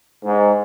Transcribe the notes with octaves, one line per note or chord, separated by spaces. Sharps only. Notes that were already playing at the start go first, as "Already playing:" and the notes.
G#2